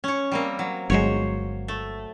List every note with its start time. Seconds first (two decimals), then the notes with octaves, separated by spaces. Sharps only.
0.04 C#4 C#5
0.32 G3 A#3 C4
0.59 F#3
0.90 G1 F#3 G#3 C5 C#5
1.68 A3